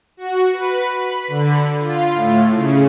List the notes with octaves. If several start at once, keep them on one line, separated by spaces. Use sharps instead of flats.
F#4
B4
B5
D3
F4
A2
C#3